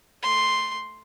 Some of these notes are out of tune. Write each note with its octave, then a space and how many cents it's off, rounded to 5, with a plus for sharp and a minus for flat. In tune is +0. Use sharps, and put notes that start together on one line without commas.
A3 +5 C6 +0